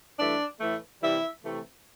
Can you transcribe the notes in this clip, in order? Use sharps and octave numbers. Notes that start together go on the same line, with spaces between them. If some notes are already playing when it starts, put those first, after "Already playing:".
G2 E3 A3 D4 D5
A2 E3 A3
C3 E3 G3 E4 E5
C3 E3 A3